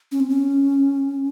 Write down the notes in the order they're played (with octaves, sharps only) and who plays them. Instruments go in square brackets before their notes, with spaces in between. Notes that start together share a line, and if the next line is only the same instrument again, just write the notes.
[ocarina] C#4
C4
C#4